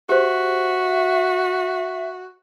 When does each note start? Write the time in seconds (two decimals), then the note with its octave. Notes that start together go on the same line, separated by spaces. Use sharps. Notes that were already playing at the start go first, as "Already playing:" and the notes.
0.09 F#4 G4 C5 E5